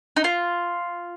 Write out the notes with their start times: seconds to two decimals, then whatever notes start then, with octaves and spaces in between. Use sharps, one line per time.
0.16 D#4
0.24 F4